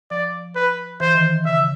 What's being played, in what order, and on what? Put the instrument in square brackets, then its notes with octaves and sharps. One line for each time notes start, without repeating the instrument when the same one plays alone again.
[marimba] F3 [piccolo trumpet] D5
[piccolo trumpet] B4
[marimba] E3 [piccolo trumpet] C5
[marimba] D#3
[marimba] C#3 [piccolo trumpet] E5